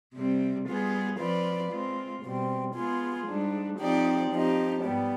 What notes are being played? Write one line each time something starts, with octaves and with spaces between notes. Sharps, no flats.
C3 G3 C4
G3 B3 F4 G#4
F3 C4 F4 B4 D5
G#3 C4 F4
B2 G3 C4
G#3 B3 F4 G#4
G#2 G3 D4
F3 C4 D#4 G4 D5
F3 C4 D#4 G4
G#2 G3 B3